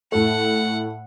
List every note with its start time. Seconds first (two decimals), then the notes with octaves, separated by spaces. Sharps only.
0.12 A2 A3 F#5